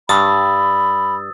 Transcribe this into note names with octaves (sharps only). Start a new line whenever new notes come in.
G2 B5 D#6 E6 A6